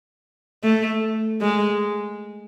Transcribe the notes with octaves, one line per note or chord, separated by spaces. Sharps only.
A3
G#3